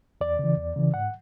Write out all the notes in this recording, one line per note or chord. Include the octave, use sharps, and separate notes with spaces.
E2 D5
C#3 E3
E2
C#3 E3
G#2 F#5